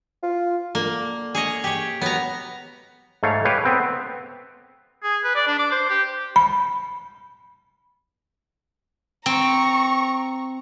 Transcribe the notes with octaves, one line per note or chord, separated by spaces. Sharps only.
F4
D3 A#3
G#4 C#5 D#5
G4 C#5
F#3 B3 A#5
G#2 A3 C#5 F5
G4 B4 C#5 F5
B3 C4 B4
G#4
B4
D5
D4
D6
C5
G4
B5
C4 A#5 C#6